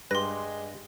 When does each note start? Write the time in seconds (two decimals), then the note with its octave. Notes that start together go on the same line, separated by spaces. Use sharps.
0.11 G2 G#3 G4 B4 C6 A#6